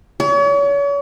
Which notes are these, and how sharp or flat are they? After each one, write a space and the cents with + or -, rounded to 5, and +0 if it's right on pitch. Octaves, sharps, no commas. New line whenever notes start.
C#5 +40